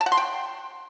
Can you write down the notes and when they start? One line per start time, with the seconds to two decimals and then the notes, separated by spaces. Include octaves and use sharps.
0.01 A5
0.06 F#5
0.12 C6
0.17 G5